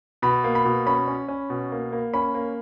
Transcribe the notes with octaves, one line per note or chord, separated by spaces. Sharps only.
B2 B5
A#3
B5
B2
C#4 B5
C#4
C#4
B2
A#3
A#3
C#4 B5
A#3